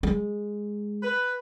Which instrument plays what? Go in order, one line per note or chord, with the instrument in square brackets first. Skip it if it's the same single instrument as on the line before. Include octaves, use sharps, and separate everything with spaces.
[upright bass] G#3
[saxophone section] B4